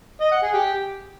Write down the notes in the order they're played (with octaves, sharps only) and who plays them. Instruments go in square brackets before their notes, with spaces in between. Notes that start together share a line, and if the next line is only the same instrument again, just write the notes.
[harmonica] D#5
F#5
G#4
G4